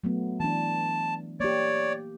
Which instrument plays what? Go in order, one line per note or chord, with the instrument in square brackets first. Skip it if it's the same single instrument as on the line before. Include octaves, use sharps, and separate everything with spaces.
[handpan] F#3 A3 B3
[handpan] E3 D4 [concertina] A5
[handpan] A#3 G4 [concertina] C#5 D5